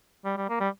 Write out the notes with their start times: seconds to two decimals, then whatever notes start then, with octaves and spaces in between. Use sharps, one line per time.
0.25 G3
0.37 G3
0.49 A#3
0.60 G3